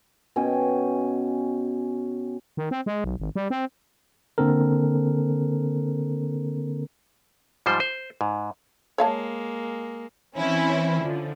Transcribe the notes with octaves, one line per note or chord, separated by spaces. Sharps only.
B2 C#4 G5 G#5
D#3
C4
G#3
B1
G#1
G3
C4
D3 A#3 C4 A4 A#4
G#2 F3 G3 C5
C5
G#2
G#3 A#3 C#5 F5 A5
E3 C4 C#4 E4
D3 F3